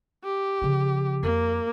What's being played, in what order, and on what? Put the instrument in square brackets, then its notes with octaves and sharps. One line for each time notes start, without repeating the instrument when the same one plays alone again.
[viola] G4
[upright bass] C#3 F3
[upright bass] F2 [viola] A#3